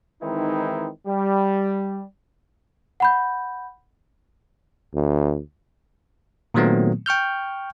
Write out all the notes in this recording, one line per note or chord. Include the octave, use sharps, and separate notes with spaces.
D#3 E3 G#3 C4 D#4 E4
G3
F#5 B5 G6
D2
A#2 D#3 F#3 A3 B3 C4
G5 C#6 F6 G6